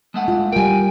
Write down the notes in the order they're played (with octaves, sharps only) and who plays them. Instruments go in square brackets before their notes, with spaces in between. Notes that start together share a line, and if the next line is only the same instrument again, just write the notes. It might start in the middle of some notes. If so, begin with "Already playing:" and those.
[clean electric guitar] G#3 A3 F#5
[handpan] F4
[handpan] G3 A#4 [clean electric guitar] G5 G#5